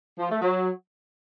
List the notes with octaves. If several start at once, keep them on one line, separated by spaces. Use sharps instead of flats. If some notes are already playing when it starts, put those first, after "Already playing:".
F3
A3
F#3